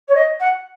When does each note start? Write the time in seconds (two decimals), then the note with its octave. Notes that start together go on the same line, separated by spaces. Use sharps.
0.08 C#5
0.15 D#5
0.39 F#5